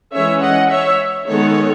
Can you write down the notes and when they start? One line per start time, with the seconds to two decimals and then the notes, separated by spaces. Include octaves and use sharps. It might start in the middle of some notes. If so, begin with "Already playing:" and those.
0.13 E3 G#3 C#4 C#5 E5
0.41 D#5 F#5
0.70 C#5 E5
1.28 D#3 G#3 B3 A4 C#5